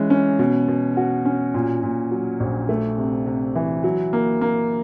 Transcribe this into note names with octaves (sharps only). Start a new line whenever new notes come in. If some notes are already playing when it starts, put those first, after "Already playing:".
Already playing: E3 G#3 C#4
C#4
B2
B2
F#4
C#4
A#2
A#2
F#3
A#1
A3
C3
C3
E3
F#3
A#3
A#3